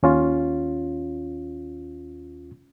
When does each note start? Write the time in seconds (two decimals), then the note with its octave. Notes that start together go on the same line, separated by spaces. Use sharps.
0.03 D#2 C#4 F4